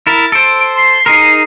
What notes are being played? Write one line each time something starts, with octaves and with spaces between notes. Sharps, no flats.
E4 A#4 A6
A4 C5 D7
C6
D#4 G#4 A#4 C7